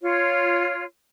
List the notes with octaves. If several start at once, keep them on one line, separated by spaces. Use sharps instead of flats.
F4 C#5